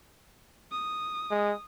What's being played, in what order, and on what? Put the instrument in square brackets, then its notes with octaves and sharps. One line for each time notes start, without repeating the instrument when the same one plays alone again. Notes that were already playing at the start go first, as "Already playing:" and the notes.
[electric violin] D#6
[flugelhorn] G#3